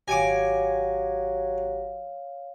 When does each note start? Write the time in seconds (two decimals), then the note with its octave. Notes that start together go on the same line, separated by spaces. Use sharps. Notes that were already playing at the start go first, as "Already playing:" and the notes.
0.08 G#1 F#3 G4 C#5 F5 G#5 D6 A#6